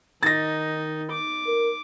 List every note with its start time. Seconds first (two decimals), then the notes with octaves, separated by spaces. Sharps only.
0.23 D#3 D#4 A6 A#6
1.11 D6
1.47 A#4